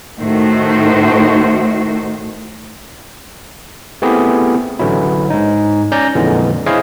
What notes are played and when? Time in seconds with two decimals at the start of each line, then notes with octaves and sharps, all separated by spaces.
0.18 A2 D#3 A3 F#4 C5
4.02 A3 B3 C4 E4 G4 G#4
4.79 A1 D3 E3 F#3 E4
5.30 G#2 D#4
5.92 C#4 D5 A#5 G6 A#6
6.15 F2 A#2 D3 E3 G#3
6.66 E4 G#4 C5 C#5 D#5 F5